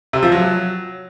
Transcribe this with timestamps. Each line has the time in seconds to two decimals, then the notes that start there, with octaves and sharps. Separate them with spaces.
0.13 C3
0.23 F3
0.32 F#3